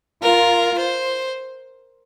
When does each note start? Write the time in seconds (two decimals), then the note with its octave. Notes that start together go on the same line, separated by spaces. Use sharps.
0.23 F4 A#4
0.79 C5